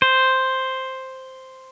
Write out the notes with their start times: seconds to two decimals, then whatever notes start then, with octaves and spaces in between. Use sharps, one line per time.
0.02 C5